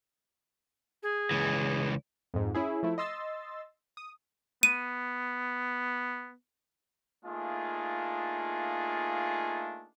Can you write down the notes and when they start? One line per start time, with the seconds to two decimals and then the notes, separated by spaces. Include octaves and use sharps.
1.02 G#4
1.31 C#2 E3
2.34 F2 G#2
2.55 C#4 E4 G#4
2.83 F3 A3 E4
2.98 D#5 C6 E6 A6
3.97 D#6
4.63 B3 D#7
7.25 A3 A#3 D4 D#4 F4 G#4